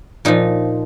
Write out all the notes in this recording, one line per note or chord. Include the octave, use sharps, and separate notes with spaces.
A#2 F3 D#4